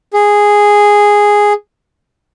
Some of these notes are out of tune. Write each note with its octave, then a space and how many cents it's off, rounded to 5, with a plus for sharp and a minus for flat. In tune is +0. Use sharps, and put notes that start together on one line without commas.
G#4 -5